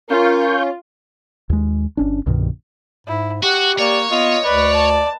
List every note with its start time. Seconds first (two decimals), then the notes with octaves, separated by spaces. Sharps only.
0.10 C#4 F4 A#4 F5 C#6 G6
1.50 D#2 G#3
1.97 G1 C#4 D4
2.26 C2 G2 B2 D#3
3.07 G#2 E4
3.43 F#4 G4 F#5
3.79 A#3 C#5 D5
4.11 B3 F4 D#5
4.45 D2 B4 D5
4.73 A5